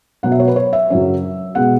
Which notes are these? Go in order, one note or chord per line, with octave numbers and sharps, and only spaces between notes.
B2 F#3 B3 F#5
E5
C#5
B4
C#5
E5
F#2 C#3 F#3 C#4
B2 G#3 B3 F#5